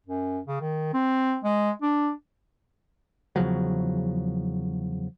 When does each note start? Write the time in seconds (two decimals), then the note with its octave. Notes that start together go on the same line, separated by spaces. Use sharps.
0.07 F#2
0.47 C#3
0.61 D#3
0.93 C4
1.44 G#3
1.82 D4
3.36 E2 C#3 F3 F#3